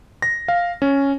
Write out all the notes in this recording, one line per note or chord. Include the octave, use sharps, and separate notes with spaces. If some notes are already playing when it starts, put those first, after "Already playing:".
A#6
F5
C#4